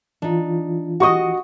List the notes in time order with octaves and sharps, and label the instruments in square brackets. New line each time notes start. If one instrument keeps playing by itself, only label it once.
[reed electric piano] E3 F4 [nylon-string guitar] D4 D#4
[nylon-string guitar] F#4 D#5 [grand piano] G4 C#6 D#6